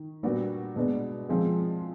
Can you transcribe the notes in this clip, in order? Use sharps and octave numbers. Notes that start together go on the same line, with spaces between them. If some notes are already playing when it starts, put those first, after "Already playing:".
Already playing: D#3
A#2 G3 B3 D4 F#4
B2 G#3 B3 D4
F3 G#3 C4 F4 G#4